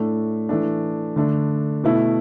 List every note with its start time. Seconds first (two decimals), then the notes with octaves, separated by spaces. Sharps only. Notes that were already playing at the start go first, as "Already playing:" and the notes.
Already playing: A2 A3 D4
0.49 E3 A3 D4
1.16 D3 A3 D4
1.84 B2 A3 E4